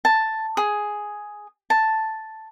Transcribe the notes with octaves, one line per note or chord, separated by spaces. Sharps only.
A5
G#4
A5